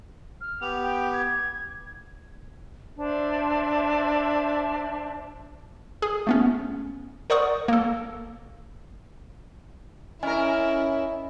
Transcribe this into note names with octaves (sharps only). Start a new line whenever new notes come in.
F6
B3 G4 F7
G5
G#6
D4 C5 E5
G#4
A3 B3 C#4
A#4 C5 D5 F#5 C#6 D#6
A#3 A4
C#4 E4 A#4 D#5 G#5